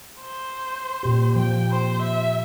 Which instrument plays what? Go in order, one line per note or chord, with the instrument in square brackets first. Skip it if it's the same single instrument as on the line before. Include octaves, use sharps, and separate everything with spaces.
[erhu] C5
[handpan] A#2 G4
[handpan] F3 [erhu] G5
[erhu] C5
E5